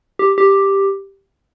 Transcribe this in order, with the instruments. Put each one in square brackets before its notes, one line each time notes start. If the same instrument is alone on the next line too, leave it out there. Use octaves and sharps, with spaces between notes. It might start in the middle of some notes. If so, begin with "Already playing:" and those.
[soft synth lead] G4
G4